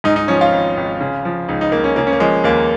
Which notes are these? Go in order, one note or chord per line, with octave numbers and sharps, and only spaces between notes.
G#2 D#4
D#4
F3 C#4
F4
G#1
G#1
C#3
F3
C#2 D#4
D#4
C#2 A#3
C#4
C#3 A#3
C#4
A#3
F3 G#3
D#2 A#3